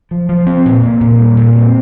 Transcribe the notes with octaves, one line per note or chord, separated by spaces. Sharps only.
F3
F3
C4
A#2
A#2
A#2
G3
A#2
C4